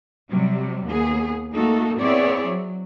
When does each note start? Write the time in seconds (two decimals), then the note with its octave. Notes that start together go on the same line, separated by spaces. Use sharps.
0.29 C3 F#3 G3
0.87 D#2 B3 G#4
1.53 A3 A#3 D#4 F#4 A4
2.00 B3 C4 E4 G#4 C#5 D5
2.46 F#3